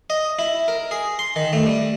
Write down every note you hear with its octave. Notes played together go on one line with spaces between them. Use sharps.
D#5
E4
A#4
G#4
C6
D#3
A3
G3